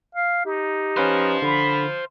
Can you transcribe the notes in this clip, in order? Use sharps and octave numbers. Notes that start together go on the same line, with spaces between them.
F5
D#4 G4
C#4 B4 C5 F5
D3 B5